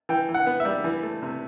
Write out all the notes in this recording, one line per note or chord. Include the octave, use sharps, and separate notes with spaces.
E3 G5
E3
F#5
B3
E5
G3
E3
A3
C3